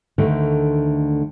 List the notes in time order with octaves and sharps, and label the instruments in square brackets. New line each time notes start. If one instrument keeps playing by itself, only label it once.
[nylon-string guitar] D2 D3 D#3 A3